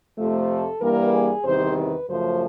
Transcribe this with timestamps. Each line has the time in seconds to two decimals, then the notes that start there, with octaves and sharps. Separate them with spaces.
0.17 F2 C3 F3 A3
0.49 A4
0.81 G2 E3 G3 A#3 A#4
1.12 G#4
1.44 E2 C3 D#3 G3 C5
1.76 B4
2.08 F#2 C#3 F3 A3 C5